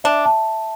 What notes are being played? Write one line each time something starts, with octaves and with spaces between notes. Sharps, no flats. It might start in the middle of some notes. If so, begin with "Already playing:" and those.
D4 E5
A5